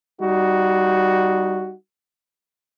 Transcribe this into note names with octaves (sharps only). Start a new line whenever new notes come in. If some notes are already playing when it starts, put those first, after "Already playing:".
G3 D#4 F#4